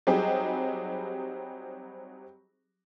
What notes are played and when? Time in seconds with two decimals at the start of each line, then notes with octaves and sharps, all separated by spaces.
0.07 F#3 G3 C4 D#4 G4 G#4